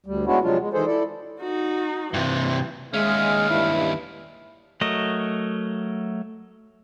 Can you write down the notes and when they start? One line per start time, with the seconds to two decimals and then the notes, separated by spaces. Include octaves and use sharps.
0.06 D2 G3
0.26 G#3 B3 C#4 D4 E4 F#4
0.43 C3 F3 F#3 G#3 D4 F4
0.60 G#3
0.73 D#3 E3 G#3 G#4 A4 C5
0.86 E4 A4 D5
1.40 D#4 F#4
2.14 G2 C3 E3
2.94 D#2 G#3 C#4 E5 F5
3.50 G2 E4
4.81 F#3 A3 A#4 D#5